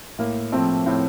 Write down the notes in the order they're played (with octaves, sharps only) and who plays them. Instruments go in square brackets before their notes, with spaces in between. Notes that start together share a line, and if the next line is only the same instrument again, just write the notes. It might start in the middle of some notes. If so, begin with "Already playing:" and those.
[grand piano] A2 [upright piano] A#3
[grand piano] F3 A3 [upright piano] C4
[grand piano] A2 [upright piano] C4